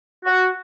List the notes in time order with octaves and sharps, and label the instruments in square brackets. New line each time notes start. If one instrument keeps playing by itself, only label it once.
[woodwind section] F#4